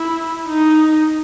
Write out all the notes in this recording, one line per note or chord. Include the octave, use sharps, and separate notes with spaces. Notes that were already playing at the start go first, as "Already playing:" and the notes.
Already playing: E4
D#4